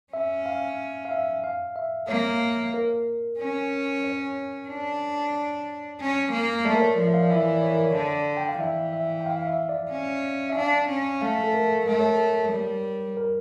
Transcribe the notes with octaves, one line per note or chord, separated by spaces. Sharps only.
C#4 E5
F5
F5
E5
F5
E5
A#3 C#5
A#4
C#4
C#5
D4
C#4
A#3
A3 D5
A#4
C#5
F3 D5
E5
F5
D5
E3 E5
D5
C#5
A#4
C#5
D3 D5
G5
F5
E3 E5
E5
G5
F5
F5
E5
D5
C#4
E5
D4 F5
C#4
A3 F5
A4
A#4
A3 A#4
C#5
A#4
G3
A#4